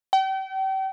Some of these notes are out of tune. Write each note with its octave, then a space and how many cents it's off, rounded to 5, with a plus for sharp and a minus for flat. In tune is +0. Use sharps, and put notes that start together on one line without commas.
G5 -35